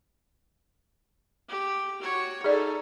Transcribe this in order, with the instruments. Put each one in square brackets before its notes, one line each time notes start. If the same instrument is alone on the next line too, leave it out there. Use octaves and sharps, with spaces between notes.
[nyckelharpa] G4
F#4 C#5
[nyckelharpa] D#4 A4 [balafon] G#4 D5